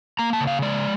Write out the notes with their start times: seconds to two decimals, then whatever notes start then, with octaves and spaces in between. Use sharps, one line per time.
0.19 A#3 A#5
0.33 A5
0.41 C#3
0.47 F5
0.62 G#3 D5